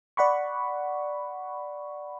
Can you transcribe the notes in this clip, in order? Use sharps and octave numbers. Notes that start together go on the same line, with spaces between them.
D5 F#5 B5 C#6